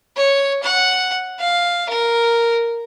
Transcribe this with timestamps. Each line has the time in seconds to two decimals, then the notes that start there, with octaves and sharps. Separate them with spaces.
0.16 C#5
0.63 F#5
1.40 F5
1.89 A#4